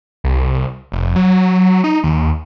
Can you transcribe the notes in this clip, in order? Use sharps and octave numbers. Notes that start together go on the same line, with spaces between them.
C2
F1
F#3
D#4
D#2